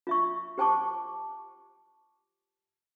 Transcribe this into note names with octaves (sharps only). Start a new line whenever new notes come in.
F4 E5 C#6
G4 C5 G5 A5 C#6 D6